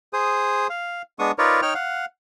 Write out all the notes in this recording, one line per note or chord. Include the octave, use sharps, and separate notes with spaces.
G#4 C5 D#6
F5
G#3 B3 D4 C#6 D#6
D#4 F4 A#4 B4 C#5 D5
D#4 C#5 G5 F6
F5 F#5